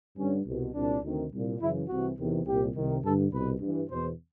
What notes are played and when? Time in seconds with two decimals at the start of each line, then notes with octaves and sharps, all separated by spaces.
0.17 G2 D3 C#4
0.46 C2 B2
0.74 C2 A#2 D4
1.03 D2 C3 D#3
1.31 C2 A#2
1.60 F#2 C#3 E3 E4
1.88 C2 C3 E3 F#4
2.18 E2 C3 D#3
2.46 C2 A#2 G4
2.75 C2 C3 D#3
3.03 G2 D3 A4
3.31 C2 B2 B4
3.60 G2 E3
3.89 E2 B2 C5